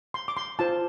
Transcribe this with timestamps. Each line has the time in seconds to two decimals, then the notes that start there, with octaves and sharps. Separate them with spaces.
0.14 C6
0.28 D6
0.37 C6
0.59 F4 C5 A5